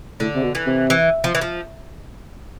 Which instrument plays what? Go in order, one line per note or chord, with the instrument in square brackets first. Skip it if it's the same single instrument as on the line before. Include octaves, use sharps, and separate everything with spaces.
[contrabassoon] A2 [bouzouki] D3
[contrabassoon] C3
B2
[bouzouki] E3
[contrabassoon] C3
[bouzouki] E3
F3
E3
F3